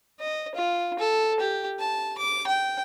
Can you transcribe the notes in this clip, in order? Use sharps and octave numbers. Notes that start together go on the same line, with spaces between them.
D#5
F4
A4
G4
A5
D6
G5